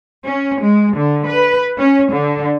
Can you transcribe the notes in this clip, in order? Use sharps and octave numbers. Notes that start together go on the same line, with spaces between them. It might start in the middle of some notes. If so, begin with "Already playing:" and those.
C#4
G#3
D3
B4
C#4
D3